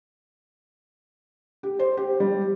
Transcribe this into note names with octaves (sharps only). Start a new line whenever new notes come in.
G4
C5
G4
G3